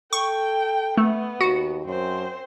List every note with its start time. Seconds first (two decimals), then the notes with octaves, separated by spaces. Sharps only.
0.13 A4 G5 C#6
0.98 A3 B3
1.41 D#2 F#4
1.85 F#2 C4 C5